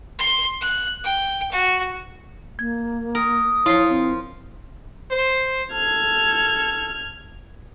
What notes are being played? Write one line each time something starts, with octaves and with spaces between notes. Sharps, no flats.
C6
F#6
G5
F#4
A#3 G#6
A#4 D#6
F3 E4 F4 C#5 C7
C4
C5
A4 F6 G#6